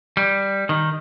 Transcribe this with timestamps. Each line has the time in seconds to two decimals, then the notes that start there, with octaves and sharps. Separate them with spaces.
0.17 G3
0.69 D#3